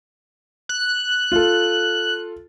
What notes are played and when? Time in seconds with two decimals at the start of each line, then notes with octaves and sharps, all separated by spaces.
0.69 F#6
1.32 F4 A4